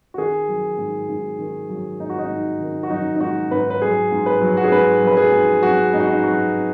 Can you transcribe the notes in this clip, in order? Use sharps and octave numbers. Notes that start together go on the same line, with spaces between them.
F#4
D#3 G#4
F#3
G#2
G#2
D#3
F#3
G#2 D#4
F#4
D#4
G#2
D#3
F#4
F#3 D#4
D#4
G#2 F#4
G#2 B4
B4
F#3 G#4
G#2
B4
F#3
F#4
G#4
G#2 B4
F#3 B4
G#4
G#2
F#3 F#4
G#2 D#4
F#4
D#4
F#3 F#4